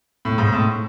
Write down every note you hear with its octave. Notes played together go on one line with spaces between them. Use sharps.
A2
G#2
A2